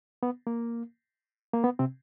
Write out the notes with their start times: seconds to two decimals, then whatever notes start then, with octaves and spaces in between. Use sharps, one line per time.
0.23 B3
0.47 A#3
1.53 A#3
1.64 B3
1.79 C3 C4